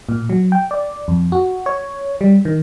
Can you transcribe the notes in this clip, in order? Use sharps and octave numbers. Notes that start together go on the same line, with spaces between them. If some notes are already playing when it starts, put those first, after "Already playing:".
A#2
F#3
G5
D5
F2
F#4
C#5
G3
D#3